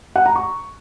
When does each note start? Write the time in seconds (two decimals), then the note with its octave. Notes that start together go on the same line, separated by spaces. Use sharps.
0.16 F#5
0.26 A#5
0.36 C#6